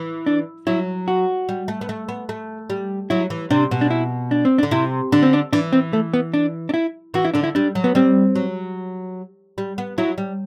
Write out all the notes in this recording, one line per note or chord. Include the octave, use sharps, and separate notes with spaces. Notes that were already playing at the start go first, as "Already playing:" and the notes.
Already playing: E3
D4
F#3 E4
F#4
G3
A3
B3
A3
B3
A3
G3
F#3 E4
E3
C3 D4
B2
D4
E4
D4
C4
D4
D3
C3 E4
D3 D4
C4
D4
E3 D4
C4
A3
B3
D4
D4
E4
E3 F#4
E4
D3 D4
E4
G3 D4
F#3
B3
G3 C4
F#3
G3
B3
F#3 E4
G3